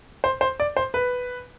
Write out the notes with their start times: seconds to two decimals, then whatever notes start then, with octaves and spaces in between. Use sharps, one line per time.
0.24 C5
0.41 C5
0.60 D5
0.77 C5
0.94 B4